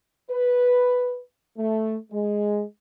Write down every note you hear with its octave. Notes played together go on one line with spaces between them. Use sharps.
B4
A3
G#3